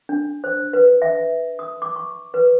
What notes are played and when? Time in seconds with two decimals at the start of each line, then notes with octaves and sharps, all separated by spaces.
0.09 D4
0.44 C5
0.73 B4
1.02 E5
1.59 D#6
1.82 D6
1.96 C#6
2.34 B4